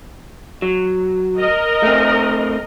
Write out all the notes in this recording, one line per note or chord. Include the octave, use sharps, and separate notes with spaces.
F#3
A#4 D#5
A3 C4